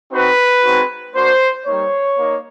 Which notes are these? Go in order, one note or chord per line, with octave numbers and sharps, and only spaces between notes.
C4 D#4 F#4 B4
G#3 C4 D#4 F#4
A#3 D4 F#4 C5
G3 A#3 D#4 C#5
A#3 D#4